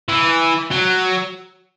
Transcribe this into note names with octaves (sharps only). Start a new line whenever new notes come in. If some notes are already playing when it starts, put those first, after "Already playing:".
E3
F#3